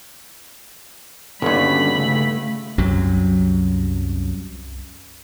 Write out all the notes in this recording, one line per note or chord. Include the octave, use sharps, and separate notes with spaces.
G1 D#2 D3 G3 C#4 F#4 B5
C#3 A3
C2 F#2 C3 F#3